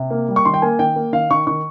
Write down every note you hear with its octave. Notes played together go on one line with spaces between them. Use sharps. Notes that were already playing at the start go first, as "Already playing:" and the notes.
Already playing: C3
A#3
G3
C#6
D#3 C6
G5
A#3 G#5
D#3 G5
A#3
D#3 F5
D#3 C#6
D#3 C#6